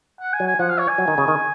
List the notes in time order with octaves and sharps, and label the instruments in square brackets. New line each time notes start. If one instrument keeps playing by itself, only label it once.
[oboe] F#5
G#5
[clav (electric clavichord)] F#3
[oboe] G#5
[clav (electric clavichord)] F3 [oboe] F#5
[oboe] F5
C#5
G#5
[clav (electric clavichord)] F#3
D#3
C#3
D#3